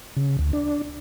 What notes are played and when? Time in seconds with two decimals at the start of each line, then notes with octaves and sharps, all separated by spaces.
0.17 C#3
0.39 D2
0.53 D4